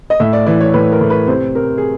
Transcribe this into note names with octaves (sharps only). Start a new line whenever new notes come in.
D#5
A2 E5
D5
E3 D5
C#5
A2 B4
A#4
A2
B4
C3 C5
C3 A#4
G#4